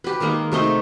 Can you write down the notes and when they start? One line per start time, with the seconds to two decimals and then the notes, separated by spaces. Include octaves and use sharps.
0.04 G4 B4
0.20 D#3 G#3 A#3 D#4
0.52 C3 A3 D#4 C6